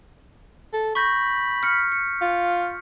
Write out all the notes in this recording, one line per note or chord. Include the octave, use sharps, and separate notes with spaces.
A4
B5 C#6 G6 A#6
F6 B6 C#7
C#7
F4